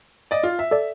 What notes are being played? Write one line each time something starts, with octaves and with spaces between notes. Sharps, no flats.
D5 D#5
F4
E5
A4 D5